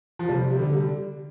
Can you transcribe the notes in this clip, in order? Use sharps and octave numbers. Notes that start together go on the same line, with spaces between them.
F3
C3 G3
G3
D3
G3